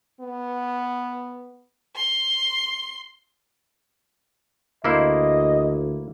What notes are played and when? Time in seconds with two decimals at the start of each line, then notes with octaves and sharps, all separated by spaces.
0.21 B3
1.96 C6
4.84 D2 A#3 E4 C5 D#5